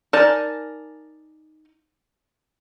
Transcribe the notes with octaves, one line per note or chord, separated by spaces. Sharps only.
D#4 A#4 D5 G#5 A5